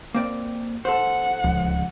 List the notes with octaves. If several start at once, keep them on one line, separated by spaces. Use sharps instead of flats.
A#3 C4 D5
A4 C5 F#5
D1 C#2 F3